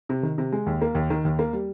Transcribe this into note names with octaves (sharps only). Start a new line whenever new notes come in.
C3
D#3
C3
G#3
D#2
A#3
D#2
D#3
D#2
A#3
G3